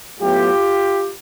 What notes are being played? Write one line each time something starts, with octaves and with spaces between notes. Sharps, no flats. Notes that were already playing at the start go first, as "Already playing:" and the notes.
A2 F#3 B3 F4 G4